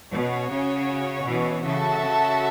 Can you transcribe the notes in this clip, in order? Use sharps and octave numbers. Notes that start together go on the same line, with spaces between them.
B2 C#4 F#4 C#5
C#3
B2 E3
C#3 F#4 A4 E5 A5
C#3